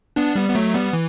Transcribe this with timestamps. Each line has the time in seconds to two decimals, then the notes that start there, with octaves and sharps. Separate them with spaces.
0.16 B3 D4
0.36 G3 B3
0.49 B3
0.55 F#3 A3
0.74 G3 B3
0.93 E3